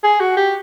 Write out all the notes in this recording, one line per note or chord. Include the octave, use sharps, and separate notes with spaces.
G#4
F#4
G4